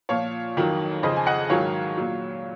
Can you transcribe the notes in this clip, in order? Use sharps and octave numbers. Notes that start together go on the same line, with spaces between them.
A#2 F3 C#5 F5
F2 D#3 F#3
F2 C#3 F3 C5 D#5
G#5
D#5 F#5
G#2 D#3 F#3 C#5 F5
A#2 F#3